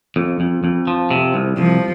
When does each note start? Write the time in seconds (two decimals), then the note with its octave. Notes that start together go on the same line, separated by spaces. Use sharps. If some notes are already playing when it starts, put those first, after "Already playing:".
0.16 F2
0.40 F2
0.64 F2
0.87 F3
1.11 C3
1.34 C2
1.57 C2 F3